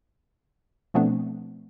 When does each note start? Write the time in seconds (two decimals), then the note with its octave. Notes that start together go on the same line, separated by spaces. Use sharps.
0.94 B2 F3 A3 B3 C4 D4